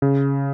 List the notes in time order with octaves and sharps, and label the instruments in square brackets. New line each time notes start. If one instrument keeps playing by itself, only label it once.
[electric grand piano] C#3